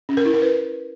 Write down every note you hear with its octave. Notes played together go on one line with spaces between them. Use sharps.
C#4
A#4
E4
A#4
B4